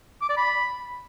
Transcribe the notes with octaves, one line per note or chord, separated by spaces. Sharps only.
D6
D5
B5